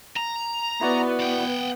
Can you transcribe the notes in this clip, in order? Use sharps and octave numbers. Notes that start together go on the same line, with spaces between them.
A#5
B3 E4 F#4 D5
F#5 G5